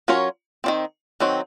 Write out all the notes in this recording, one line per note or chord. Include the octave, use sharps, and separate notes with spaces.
F#3 C#4 F4 A#4 C#5
D#3 F#3 C4
D#3 F#3 C4